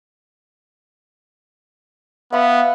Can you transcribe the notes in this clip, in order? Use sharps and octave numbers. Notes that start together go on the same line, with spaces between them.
B3 E5 F5 B5